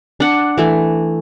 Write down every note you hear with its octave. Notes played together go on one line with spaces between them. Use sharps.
D4 F#5
E3 A3